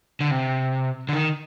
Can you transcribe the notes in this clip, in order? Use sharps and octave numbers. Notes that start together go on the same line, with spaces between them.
D3
C3
D3
D#3